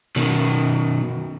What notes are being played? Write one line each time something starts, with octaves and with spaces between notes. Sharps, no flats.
B2 D#3